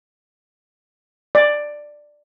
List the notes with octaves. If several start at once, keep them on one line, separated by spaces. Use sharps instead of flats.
D5